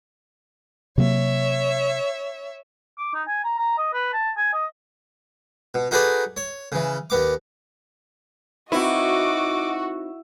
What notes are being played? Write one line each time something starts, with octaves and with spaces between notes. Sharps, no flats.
C3 F#3 A#3 C#5 E5
D6
D#4
G#5
A#5
A#5
D#5
B4
A5
G#5
D#5
B2
D#4 F#4 G#4 A4 B4 D5
C#5
C#3 E3
D#2 B3 D6
C4 D#4 E4 F#4 B4 D#5 D6